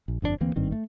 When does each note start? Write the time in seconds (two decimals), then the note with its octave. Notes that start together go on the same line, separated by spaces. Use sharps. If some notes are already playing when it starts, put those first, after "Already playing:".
0.08 A#1
0.22 G1 F2 C3 D4
0.41 D2 E3 A#3 C4
0.56 G#1 G2 D#3 C4
0.72 A3